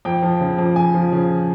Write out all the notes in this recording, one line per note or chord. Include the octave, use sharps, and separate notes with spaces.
F2 G5
F3
C#3
F2
F2 G#5
F3
C#3